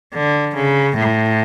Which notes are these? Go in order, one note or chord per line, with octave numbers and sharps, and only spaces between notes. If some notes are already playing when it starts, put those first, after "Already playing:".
D3
C#3
A2